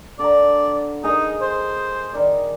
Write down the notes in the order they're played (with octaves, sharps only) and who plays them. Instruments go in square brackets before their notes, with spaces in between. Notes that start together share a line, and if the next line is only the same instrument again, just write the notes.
[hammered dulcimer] D3 A#5 [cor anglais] D5
[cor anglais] D#4 [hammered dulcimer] G#4 A#4 D#5
[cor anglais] C5
[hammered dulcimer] D#3 D5